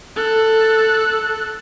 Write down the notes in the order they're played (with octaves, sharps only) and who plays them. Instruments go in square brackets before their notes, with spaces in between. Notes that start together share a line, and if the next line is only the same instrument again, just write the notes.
[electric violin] A4 F#6